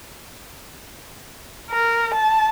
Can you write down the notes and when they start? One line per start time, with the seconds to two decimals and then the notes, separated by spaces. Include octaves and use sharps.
1.70 A#4
2.14 A5